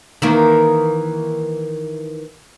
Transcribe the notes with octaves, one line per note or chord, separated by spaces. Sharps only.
D#3 E3 A#3